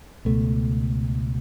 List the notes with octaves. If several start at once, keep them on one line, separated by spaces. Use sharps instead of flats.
C#2 B2 A3